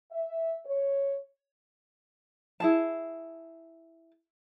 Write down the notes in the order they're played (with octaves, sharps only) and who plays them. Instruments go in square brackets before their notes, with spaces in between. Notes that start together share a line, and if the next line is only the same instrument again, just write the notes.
[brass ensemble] E5
C#5
[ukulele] E4 G#4 A5